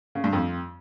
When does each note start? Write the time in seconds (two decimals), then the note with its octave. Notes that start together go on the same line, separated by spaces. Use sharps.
0.15 C#3
0.24 G2
0.33 F2